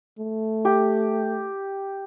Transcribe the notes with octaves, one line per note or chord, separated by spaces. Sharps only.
A3
G4